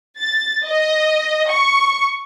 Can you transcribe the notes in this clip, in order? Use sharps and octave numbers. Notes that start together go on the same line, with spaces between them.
A6
D#5
C#6